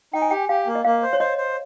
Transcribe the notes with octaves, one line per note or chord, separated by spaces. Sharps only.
D#4 G5
G#5
G4 G5
G4 F5
A#3
D#5
A#3 F5
C5
C#5
C5 D#5
C5